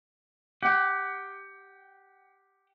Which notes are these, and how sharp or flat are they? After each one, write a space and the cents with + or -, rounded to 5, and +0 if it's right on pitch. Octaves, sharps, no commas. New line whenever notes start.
G4 +0 F#5 +25